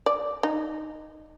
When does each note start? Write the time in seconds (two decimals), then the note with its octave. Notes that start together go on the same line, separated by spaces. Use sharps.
0.06 D5
0.43 D#4